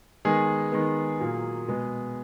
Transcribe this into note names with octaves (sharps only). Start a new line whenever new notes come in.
D#3 G#3 B3 G#4
D#3 G#3 B3
A#2 F#3 A#3
B2 G#3 B3